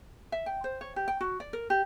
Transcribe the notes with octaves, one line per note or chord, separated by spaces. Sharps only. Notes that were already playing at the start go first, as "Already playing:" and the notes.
E5
G5
C5
C#5
G4
G5
F#4
D5
A#4
G4